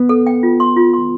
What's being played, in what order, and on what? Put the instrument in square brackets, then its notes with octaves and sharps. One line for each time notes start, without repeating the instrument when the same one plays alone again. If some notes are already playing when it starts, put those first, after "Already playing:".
Already playing: [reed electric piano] B3
[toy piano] A4
G5
F4
C6
F4
C6